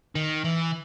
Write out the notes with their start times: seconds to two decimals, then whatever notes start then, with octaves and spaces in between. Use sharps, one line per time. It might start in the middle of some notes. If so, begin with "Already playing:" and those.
0.15 D#3
0.44 E3